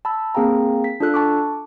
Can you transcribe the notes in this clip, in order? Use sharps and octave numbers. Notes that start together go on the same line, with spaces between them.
A5 B5 E6
A#3 C4 G#4 F5 G5 A#5
B6
D4 F4 A4 F#6
A5 C#6 D6